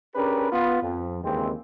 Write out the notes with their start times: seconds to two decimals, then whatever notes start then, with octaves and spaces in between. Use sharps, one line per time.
0.15 C#4 D4 G4 G#4 A#4 B4
0.51 B3 F4
0.82 F2
1.23 D#2 C#3 E3 G#3 C4